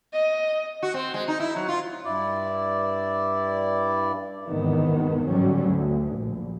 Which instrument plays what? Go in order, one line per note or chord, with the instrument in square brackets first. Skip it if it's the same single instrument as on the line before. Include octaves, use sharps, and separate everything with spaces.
[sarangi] D#5
[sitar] F#4
C4
G#3
D#4
E4
F#3
F4
[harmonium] G2 E4 D5
[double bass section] G1 E2 G#2 C3 D#3 B3
G#2 D3 F#3 G3 C#4
D2
A#1